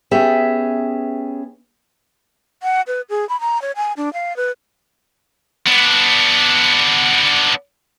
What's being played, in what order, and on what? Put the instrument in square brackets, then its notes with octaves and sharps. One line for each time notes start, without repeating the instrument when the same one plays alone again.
[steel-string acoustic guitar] B3 C#4 G4 G#4 E5
[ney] F#5
B4
G#4
B5
A#5
C#5
G#5
D4
F5
B4
[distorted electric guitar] B3 D4